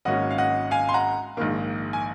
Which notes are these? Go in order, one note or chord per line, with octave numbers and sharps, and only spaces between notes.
G#1 G#2 F#3 A#3 C#4 D#5 F#5
F5
D#5 F#5
F5 G#5
C6
F#5 A#5
A#1 G#2 D#3 A#3
G#5